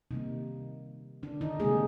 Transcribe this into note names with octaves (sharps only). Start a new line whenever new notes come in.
C3 D#3 G3 A#3 D#4
D3 D4
D#3 D#4
C3 G3 G#3 A#3 G#4